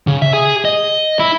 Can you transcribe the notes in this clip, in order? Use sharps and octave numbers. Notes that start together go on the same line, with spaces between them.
C#3
E5
G#4
D#5
E4